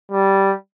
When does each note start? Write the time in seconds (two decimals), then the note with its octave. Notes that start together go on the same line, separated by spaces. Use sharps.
0.12 G3